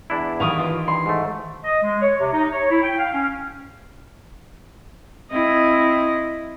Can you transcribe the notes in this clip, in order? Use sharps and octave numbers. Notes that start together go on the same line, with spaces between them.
E2 D4 E4
D#3 E3 G4 F5 C#6 D#6
F4
G2 C6
G#2 A3
D#5
G#3
C#5
C3
D#4
C#5
E4
G5
F5
C#4
C4 E4 D#5